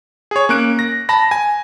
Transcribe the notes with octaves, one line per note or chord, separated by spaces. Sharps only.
G#4 C#5
A#3 C#4 F#6 D7
A#6
A5 B5 A#6
G#5